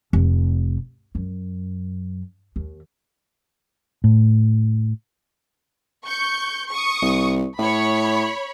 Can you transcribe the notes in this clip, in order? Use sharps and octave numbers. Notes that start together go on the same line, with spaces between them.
F1
F#2
D#2
A2
C#6 G6
C#6 D#6
C2
A2 C#5 B5